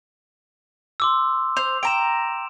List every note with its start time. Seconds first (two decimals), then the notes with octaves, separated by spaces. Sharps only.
1.00 C6 D6 E6
1.57 C5 F7
1.83 G5 A#5 D7 E7